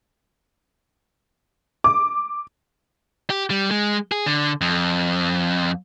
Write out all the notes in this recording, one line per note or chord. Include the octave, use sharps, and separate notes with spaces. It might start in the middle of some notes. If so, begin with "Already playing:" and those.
D6
G4
G3
G#3
G#4
D3
F2